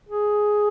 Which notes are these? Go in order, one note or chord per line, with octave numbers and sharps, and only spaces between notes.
G#4